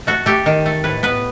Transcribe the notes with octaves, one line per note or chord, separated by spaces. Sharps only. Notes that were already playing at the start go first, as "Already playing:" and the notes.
A3 F#4
A3 G4
D#3
A3
A2 B4
B3 B4